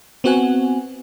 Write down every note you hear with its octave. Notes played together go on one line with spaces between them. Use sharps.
B3 C4 F#4 F#5 G#5